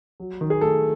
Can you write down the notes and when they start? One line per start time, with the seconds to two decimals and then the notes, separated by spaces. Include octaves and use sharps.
0.20 F#3
0.41 D#3
0.50 G#4
0.61 A3 A4